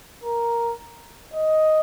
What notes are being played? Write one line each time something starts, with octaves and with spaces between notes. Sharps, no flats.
A#4
D#5